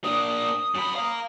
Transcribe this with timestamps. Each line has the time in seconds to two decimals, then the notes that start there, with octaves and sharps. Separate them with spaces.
0.04 A#3 D4 D#6
0.75 F#2 B5
0.96 F5 A#5